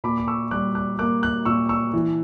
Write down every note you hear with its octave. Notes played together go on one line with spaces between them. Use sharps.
A#2 B5 D6
D6
C#6 E6
G3 D6 F#6
D6 F#6
A#3 D6 F#6
D6 F#6
A#2 C#6 E6
C#6 E6
E3